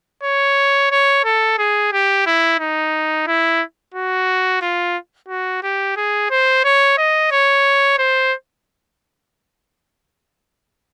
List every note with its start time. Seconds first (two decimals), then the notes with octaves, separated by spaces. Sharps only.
0.23 C#5
0.91 C#5
1.24 A4
1.58 G#4
1.93 G4
2.26 E4
2.60 D#4
3.27 E4
3.94 F#4
4.62 F4
5.28 F#4
5.63 G4
5.96 G#4
6.30 C5
6.64 C#5
6.98 D#5
7.31 C#5
7.98 C5